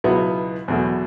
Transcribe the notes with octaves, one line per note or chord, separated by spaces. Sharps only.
C#2 B2 F#3 B3 E4
E2 B2 F#3 A3